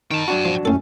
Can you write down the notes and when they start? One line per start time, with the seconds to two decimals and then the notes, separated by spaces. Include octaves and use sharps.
0.11 D#3 G5 A5
0.28 F#3 D4 F#4
0.45 F3
0.65 F#2 A2 C#4 A4